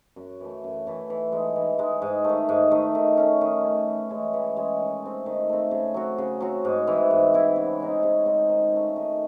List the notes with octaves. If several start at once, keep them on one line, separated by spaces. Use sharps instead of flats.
F#2
E3 A3
F#2
E3 A3
E3
G#3 D#4
E3
G#3 D#4
G#2
A3
D#3
G#2
D#3 A3
D#3
A3 C#4
D#3
A3 C#4
E3
G#3 C#4
E3
G#3 C#4
D#3
A3 C4
D#3
A3 C4
C#3
F#3 C4 F#4
C#3
F#3 C4 F#4
G#2
E3 C4 E4
G#2
E3 C4 E4
C#3
G#3 C4 D#4
C#3
G#3 C4 D#4
D#3
A3 C#4
D#3